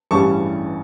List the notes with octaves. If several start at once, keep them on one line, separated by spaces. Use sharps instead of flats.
A1 G2 E3 G3 C#4 A5 C#6